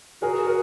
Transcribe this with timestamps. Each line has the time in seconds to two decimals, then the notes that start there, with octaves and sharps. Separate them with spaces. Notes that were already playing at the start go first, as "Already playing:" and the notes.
0.22 F#4 G#4 A#4
0.47 G#4 A#4